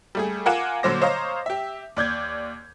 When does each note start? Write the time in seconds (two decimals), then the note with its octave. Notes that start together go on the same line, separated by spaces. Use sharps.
0.15 G3 A3 G#4
0.46 F4 A#4 F#5 G#5 D6 E7
0.83 A#2 D3 F#3 C5 D6 A#6
1.02 C5 C#5 D#5 F5 A#5
1.46 G4 E5
1.96 D#2 D5 G6 G#6